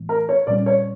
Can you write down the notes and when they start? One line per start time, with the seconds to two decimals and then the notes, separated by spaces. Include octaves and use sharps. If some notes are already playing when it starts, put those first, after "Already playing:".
Already playing: A2 E3 A3
0.09 A#4
0.29 C#5
0.47 A#2 G3 C#4 D5
0.66 C#5